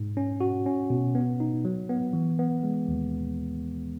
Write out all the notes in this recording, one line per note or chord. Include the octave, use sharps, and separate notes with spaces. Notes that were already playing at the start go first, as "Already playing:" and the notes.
Already playing: G#2
C#4
F#4
C#4
B2
B3
D#4
F#3
B3
E3
B3
G#3
D#2